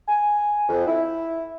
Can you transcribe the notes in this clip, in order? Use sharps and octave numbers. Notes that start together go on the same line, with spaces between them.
G#5
F2
E4